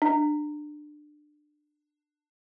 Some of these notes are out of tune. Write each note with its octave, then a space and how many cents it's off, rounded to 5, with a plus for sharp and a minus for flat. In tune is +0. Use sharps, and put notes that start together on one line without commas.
D4 +25